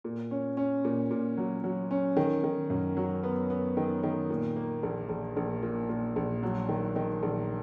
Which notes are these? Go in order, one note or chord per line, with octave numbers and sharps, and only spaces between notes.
A#2
C#4
C#4
A#2
A#2
F#3
F#3
C#4
D#3
D#3
F#2
F#3
B3
B3
D#3
D#3
A#2
A#3
A#1
A#1
A#1
A#2
A#2
A#1
F#3
D#3
D#3
A#1